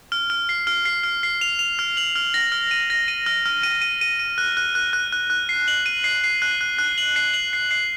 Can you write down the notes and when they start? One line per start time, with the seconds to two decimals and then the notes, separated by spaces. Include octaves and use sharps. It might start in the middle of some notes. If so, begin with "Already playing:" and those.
0.12 F6
0.30 F6
0.49 C7
0.67 F6
0.85 C7
1.03 F6
1.23 C7
1.41 F7
1.59 F7
1.79 F6
1.97 F#7
2.15 F6
2.34 A#6
2.52 F6
2.71 D#7
2.90 A#6
3.08 D#7
3.26 F6
3.46 F6
3.63 D#7
3.82 D#7
4.01 D#7
4.19 D#7
4.38 F#6
4.57 F#6
4.75 F#6
4.93 F#6
5.12 F#6
5.30 F#6
5.49 C7
5.68 F#7
5.86 D#7
6.04 C7
6.24 C7
6.42 F#6
6.61 F#6
6.78 F#6
6.98 F#7
7.16 C7
7.34 F#7
7.53 C7
7.71 C7